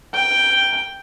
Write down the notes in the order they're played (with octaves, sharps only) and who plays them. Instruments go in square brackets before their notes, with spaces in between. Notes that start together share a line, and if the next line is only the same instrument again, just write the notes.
[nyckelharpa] G5